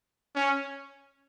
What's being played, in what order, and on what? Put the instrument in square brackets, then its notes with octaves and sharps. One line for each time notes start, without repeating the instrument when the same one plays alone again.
[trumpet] C#4